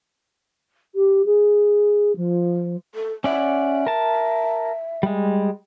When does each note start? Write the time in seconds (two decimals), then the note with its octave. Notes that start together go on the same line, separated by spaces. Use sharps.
0.95 G4
1.25 G#4
2.16 F3
2.95 A4
3.24 C#4 D5 E5 F#5
3.87 A#4 A5
5.03 G3 G#3